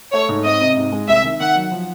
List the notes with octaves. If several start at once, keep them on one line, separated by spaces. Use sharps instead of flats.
A3 C#5
G#2
C4 D#5
C3
G#2
G#3
C2 E5
D#3
D#3 F#5
F#3
F3